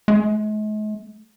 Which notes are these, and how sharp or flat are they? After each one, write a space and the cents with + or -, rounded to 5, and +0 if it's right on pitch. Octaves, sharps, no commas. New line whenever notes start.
G#3 +45